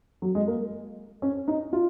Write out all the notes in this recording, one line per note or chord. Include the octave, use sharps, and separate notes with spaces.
F#3
G#3
A#3
C#4
D#4
F4